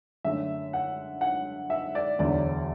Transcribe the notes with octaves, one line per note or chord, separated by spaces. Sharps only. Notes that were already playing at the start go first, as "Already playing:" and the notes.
F#2 D3 A3 D4 E5
F#5
F#5
E5
D5
E1 D2 D3 F#3 D5